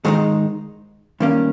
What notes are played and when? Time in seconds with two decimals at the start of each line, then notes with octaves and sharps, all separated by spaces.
0.05 G#2 D#3 G#3 D#4
1.20 G2 D#3 A#3 C#4